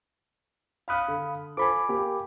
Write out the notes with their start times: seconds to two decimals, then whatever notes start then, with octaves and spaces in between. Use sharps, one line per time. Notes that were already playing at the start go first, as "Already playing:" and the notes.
0.88 F5 B5 D#6 F6 F#6
1.08 D3
1.57 F4 A4 C5 G#5 B5 D6
1.89 A#3 G4